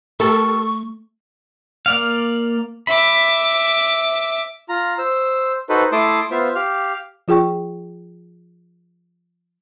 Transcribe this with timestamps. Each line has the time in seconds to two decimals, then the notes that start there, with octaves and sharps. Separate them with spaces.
0.20 A3 G4 A4 A#4 C#6
1.86 A#3 D5 F5
2.87 E5 B5 D6
4.69 F4 A#5
4.99 C5 E6
5.69 D#4 F#4 A4 B4 C5
5.92 A3 E4 A5 C6 D6 D#6
6.31 B3 F4 C5 E5 F5
6.55 G4 F5 F6
7.28 F3 F4 G#4 G5 C#6